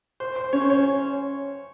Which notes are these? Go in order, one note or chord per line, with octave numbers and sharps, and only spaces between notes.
C5
C5
C#4 C#5
C5
C#5